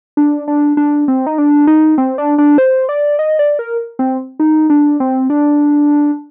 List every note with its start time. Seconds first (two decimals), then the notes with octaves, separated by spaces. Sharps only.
0.17 D4
0.48 D4
0.77 D4
1.08 C4
1.27 D#4
1.38 D4
1.67 D#4
1.98 C4
2.18 D4
2.38 D4
2.58 C5
2.89 D5
3.19 D#5
3.39 D5
3.59 A#4
3.99 C4
4.40 D#4
4.70 D4
5.00 C4
5.30 D4